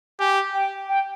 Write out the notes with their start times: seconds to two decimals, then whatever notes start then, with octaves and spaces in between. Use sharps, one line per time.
0.20 G4 G#5
0.54 G5
0.89 G5